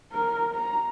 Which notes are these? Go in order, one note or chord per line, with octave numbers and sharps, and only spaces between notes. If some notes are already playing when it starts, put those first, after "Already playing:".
A#4
A#5